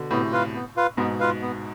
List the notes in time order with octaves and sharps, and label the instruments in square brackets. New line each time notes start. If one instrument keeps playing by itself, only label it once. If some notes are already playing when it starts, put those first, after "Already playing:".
Already playing: [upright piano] B2 D3
[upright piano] A2 C3 [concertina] B3
[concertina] F4 B4 F5
B3
F4 B4 F5
[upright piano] G#2 B2 [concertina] B3
[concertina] F4 B4 F5
B3